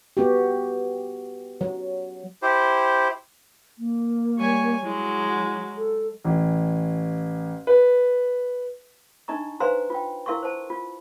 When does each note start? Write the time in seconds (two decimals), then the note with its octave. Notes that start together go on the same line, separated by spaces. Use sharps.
0.17 B3 F#4 G4
1.61 F#3
2.42 E4 G4 C5
3.78 A#3
4.38 G3 C#5 G#5
4.84 F#3 G#3 E4 F#4
5.77 A4
6.24 A1
7.67 B4
9.28 D4 D#4 D#5 A#5 C#6
9.60 B4 C5 F5 G#5 A#5 C6
9.90 F4 G5
10.26 E4 A#4 F5 C6 C#6
10.43 C5 A5
10.70 F4